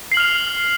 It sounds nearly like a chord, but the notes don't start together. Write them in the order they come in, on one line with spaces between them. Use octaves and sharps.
C7 F#7 F6 F7